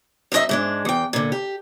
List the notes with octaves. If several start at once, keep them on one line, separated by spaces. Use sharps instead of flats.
F#2 C4 D#4 D#5 E5
G#2 G#3 D4
E2 G5
A#2 D3
G4